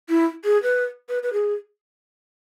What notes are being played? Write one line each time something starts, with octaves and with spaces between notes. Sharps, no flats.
E4
G#4
B4
B4
B4
G#4